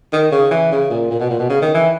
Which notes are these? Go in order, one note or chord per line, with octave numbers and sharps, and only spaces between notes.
D#3
C#3
E3
C#3
A#2
A#2
B2
A#2
B2
C#3
D#3
E3